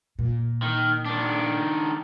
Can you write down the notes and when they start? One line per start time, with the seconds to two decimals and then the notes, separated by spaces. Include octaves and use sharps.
0.19 A#2
0.62 D#3
1.05 D#3 D4